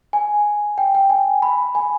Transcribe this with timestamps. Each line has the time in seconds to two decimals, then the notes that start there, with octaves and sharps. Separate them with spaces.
0.13 G#5
0.78 G5
0.95 G5
1.10 G#5
1.42 B5
1.75 G#5